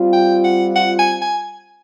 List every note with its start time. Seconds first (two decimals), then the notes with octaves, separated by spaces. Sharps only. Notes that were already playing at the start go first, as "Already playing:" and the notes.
Already playing: G3 C4 F4
0.13 G5
0.44 F#5
0.76 F#5
0.99 G#5
1.22 G#5